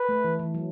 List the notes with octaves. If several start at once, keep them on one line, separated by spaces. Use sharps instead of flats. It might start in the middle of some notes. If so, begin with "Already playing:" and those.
Already playing: B4
A3
E3
E3
F#3